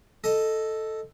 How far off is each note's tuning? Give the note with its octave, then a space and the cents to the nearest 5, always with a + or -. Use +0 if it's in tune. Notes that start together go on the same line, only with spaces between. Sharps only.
A4 +0 D#5 +0